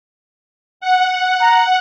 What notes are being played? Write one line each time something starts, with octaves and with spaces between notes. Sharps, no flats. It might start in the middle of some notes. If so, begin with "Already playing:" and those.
F#5
A#5